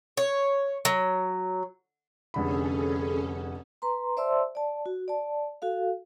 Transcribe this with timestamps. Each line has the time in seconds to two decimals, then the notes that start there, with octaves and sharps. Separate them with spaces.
0.17 C#5
0.85 F#3
2.34 F1 D3 C#4 G#4 A4 B5
3.82 B4 A#5 C6
4.17 C5 D5 E5 A5 C6 E6
4.55 D5 A5
4.86 F#4
5.08 D5 A5
5.62 F#4 A4 F5